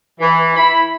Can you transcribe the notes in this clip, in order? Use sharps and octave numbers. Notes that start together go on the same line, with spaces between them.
E3
E4 B5